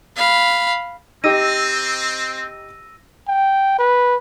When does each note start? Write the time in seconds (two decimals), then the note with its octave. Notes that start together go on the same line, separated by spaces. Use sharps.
0.16 F5 B5
1.24 C4 D#4 G4 E6 A#6 D#7
3.28 G5
3.79 B4